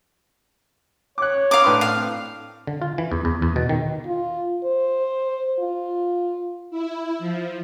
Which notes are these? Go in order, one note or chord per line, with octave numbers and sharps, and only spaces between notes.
C#5 D6 F#6
F5 A#5 D6 D#6
A2 D4 B4 C6
F5
C4
D3
F4
E3
E2
E2
E2
B2
D#3
F4
C5
F4
E4
F3